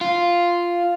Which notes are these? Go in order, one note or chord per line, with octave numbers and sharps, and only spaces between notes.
F4